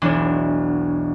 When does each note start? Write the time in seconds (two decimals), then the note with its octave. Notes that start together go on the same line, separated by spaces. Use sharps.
0.02 E1 B1 E3 D4